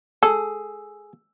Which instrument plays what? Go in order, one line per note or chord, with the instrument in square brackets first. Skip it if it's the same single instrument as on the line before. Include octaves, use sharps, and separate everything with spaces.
[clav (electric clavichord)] G#4 [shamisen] A4 [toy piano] E6